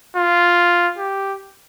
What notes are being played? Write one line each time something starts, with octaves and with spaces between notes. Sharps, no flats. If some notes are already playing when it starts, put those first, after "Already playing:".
F4
G4